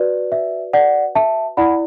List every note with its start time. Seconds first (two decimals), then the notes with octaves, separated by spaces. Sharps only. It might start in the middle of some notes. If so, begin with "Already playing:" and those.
Already playing: F#4 B4 D5
0.32 E5
0.73 D5 F#5
1.15 E5 A5
1.57 E4 D5 F#5 B5